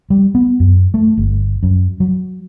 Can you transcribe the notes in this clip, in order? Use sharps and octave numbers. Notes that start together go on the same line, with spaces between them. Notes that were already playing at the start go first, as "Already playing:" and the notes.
G3
B3
F#2
A3
G1
F#2
F#3